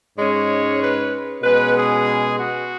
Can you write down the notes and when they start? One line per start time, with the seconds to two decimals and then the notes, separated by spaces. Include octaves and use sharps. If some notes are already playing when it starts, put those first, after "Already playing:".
0.16 G#2 G#3 C#4 C#5
0.79 B4
1.42 B2 G#3 C#4 B4
1.75 G#4
2.37 F#4